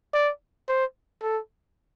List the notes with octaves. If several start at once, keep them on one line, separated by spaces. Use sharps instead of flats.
D5
C5
A4